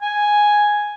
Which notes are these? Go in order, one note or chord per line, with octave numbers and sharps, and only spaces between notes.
G#5